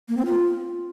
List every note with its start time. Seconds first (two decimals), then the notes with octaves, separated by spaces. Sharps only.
0.09 A#3
0.17 C4
0.26 F4